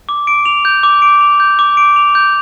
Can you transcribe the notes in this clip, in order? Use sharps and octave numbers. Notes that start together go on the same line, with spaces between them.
D6
D7
F7
G6
D6
D7
F7
G6
D6
D7
F7
G6